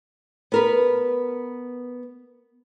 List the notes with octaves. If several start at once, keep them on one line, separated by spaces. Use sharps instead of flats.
B3 A#4 B4